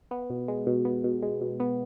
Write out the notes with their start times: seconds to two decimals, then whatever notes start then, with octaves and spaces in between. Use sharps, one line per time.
0.11 B3
0.30 B2
0.48 G#3
0.67 B2
0.85 B3
1.04 B2
1.22 G#3
1.41 B2
1.60 B3